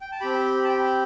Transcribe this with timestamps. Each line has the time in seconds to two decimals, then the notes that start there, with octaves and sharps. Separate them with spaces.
0.01 G5
0.12 A5
0.20 C4 G4 G5 B5
0.64 A5
0.69 G5 B5